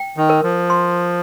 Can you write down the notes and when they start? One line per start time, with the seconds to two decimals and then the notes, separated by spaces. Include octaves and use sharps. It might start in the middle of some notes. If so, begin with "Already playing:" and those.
Already playing: G5
0.17 D#3
0.29 A#4
0.43 F3
0.70 C6